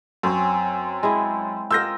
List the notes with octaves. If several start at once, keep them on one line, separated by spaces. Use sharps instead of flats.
F#2 C4 C#4 C5
G#3 E4
F4 A#4 D#5 E6 G6 A#6